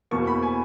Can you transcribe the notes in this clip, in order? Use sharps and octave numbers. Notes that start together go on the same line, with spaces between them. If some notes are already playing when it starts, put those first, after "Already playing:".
E2 B2 A#3 C#6
B5
G#5